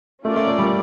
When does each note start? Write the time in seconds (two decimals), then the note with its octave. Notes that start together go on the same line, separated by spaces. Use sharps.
0.25 A3 C#4 F4 A#4 D5
0.36 A3
0.48 A3
0.59 G3